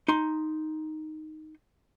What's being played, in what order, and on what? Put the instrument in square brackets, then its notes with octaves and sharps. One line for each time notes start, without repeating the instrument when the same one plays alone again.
[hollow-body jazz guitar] D#4 C6